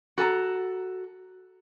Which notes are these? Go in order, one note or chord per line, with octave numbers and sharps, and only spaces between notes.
F#4 A4 G#5 A#5